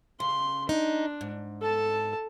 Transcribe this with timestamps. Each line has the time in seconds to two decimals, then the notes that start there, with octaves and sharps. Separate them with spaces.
0.20 C#3 C6
0.69 D4 D#4
1.21 G#2
1.61 A4 A5